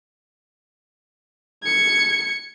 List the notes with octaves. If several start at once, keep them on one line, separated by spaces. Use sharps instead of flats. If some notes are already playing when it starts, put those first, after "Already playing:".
G#6 C#7